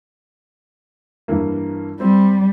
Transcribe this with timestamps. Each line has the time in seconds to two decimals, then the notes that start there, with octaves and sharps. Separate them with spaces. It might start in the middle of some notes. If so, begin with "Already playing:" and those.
1.28 G2 E3 A#3
2.00 G3 C4